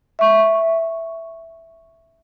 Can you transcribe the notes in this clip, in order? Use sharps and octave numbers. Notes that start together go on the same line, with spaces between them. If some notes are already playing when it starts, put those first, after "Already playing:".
E5 C#6